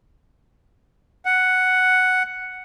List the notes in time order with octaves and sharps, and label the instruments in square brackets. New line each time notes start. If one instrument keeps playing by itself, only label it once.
[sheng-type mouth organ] F#5